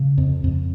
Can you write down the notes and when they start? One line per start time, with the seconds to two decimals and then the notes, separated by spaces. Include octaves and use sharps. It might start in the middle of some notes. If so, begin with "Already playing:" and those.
Already playing: C#3
0.18 F2
0.44 F2